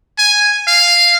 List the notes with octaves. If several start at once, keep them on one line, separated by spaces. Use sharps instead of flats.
G#5
F5